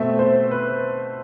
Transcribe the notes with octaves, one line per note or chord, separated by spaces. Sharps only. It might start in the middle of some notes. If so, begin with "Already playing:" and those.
Already playing: B2 A3 C4 E5
C5
B4